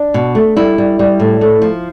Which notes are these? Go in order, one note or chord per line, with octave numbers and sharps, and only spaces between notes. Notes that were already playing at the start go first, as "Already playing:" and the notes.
Already playing: D4
B2
A3
G3 E4
G3
G3
A2
A3
F3